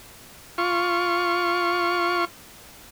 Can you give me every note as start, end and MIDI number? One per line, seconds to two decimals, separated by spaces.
0.58 2.25 65
0.58 2.25 85